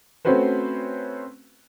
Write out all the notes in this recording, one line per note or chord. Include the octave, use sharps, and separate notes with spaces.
A3 C4 C#4 F#4 B4 C5